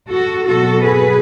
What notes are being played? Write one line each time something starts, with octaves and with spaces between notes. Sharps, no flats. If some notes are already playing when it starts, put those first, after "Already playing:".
F#4 A4
B2 F#3 B3 F#4 A4
G#4 B4